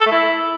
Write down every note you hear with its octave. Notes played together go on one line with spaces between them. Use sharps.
A4
A3
E4